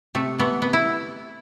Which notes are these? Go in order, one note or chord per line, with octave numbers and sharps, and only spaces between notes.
C3 A3
E3 A3 B3
C3 B3
E4